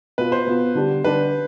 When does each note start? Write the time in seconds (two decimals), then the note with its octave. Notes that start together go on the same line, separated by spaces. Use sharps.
0.18 B2 B3 F4 B4
0.32 C5
0.46 B2 B3 F4
0.75 D3 G3 D4 G4
1.04 D3 G3 D4 G4 B4